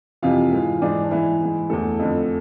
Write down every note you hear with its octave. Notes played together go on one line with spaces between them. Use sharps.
F2 C3 E3 F4 F5
G#2 E3
G#2 E3 D4 D5
D4
G#2 E3 E4
G#2 E3
E2 D3 A3 A4
F2 D3